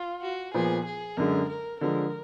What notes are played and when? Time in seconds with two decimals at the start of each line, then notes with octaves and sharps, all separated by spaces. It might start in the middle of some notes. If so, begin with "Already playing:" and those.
Already playing: F4
0.22 F#4
0.54 A#2 F3 B3 G#4
0.86 G#4
1.17 F#2 D3 G#3 A#4
1.49 A#4
1.80 D3 F3 G#3 A#4